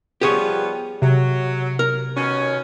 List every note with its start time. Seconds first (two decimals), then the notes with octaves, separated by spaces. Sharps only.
0.21 F3 G3 B3 G4 G#4 C#5
1.02 C3 F#3
1.79 A#4
2.16 B2 D#3 C#4